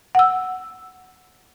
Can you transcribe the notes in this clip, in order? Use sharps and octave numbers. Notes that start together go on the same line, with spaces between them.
F#5 E6